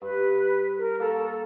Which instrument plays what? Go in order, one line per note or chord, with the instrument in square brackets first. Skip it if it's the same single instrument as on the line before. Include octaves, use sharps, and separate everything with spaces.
[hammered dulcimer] G2 [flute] B4
[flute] A#4
[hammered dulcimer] A#3 A#5 C#6 [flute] A4